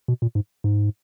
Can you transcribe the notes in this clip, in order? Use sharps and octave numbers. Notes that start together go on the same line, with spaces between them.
B2
A#2
G#2
G#2